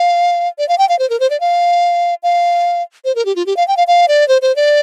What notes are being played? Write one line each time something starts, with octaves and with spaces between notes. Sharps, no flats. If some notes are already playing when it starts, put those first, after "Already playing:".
Already playing: F5
D5
F5
G5
F5
C5
A#4
C5
D5
F5
F5
C5
A#4
G4
F4
G4
F5
G5
F5
F5
D5
C5
C5
D5